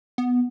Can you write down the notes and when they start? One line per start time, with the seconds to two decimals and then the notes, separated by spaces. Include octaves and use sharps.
0.18 B3